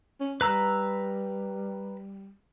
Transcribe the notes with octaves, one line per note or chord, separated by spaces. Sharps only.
C#4
G3 B4 A#5 E6